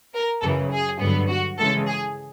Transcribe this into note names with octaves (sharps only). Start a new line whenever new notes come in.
A#4
F#2 C#3 E3 A4
G#4
G2 D3 F#3 B3
F#4
C#3 E3 G#3 A4
G#4